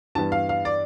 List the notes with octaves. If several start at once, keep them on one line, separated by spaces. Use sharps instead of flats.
G2 E3 G3 B3 A5
F5
F5
D5